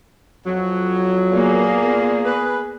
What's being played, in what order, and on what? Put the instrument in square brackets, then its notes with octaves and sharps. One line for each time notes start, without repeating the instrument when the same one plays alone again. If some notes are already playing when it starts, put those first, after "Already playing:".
[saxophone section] F2 F#3
[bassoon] A#2 [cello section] A#3 B3 [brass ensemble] G#4
[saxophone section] B4